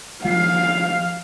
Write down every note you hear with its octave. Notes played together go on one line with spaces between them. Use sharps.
F3 F5 C7